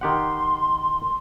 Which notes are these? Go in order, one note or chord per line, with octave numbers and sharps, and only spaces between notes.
D#3 G4 F#5 C6